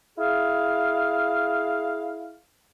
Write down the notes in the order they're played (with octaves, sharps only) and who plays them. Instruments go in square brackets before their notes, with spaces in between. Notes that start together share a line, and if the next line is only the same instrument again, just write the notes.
[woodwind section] E4 G#4 F5